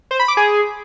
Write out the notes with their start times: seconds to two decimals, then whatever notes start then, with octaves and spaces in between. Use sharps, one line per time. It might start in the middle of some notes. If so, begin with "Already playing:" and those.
0.11 C5
0.20 B5
0.28 D6
0.37 G#4